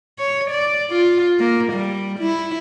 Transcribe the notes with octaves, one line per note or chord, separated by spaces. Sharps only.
C#5
D5
F4
A#3
G3
E4